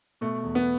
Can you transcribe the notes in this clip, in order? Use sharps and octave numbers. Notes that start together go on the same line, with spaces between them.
B2 A3
E2
B3